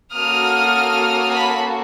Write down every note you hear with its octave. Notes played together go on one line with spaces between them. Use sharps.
A#3 C#4 F#4 A4 D#6 F6
A5 B5